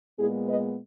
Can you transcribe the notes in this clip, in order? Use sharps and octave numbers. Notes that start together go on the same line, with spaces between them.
A#2 G#3 B3 E4 G#4
B4 D#5